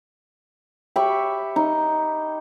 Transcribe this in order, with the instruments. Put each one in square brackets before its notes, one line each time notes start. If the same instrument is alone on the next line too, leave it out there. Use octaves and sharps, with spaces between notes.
[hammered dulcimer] G4 E5 B5 C#6
D#4